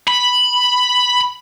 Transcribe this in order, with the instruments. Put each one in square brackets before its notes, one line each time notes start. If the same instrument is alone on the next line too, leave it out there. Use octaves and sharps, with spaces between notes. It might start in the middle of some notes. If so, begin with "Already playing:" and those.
[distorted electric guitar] B5